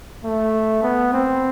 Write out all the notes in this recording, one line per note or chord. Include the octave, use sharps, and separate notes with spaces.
A3
B3
C4